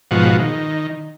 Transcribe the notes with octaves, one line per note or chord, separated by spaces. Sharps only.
G#2 B2 F3 F#4
D#3